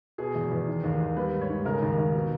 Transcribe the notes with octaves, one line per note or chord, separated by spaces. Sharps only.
B2 G#4
E2
E2
D#3
D#2
D#2
G3 B4
G#2
C#5
G#2
C#3 A#4
D#2
D#2
B2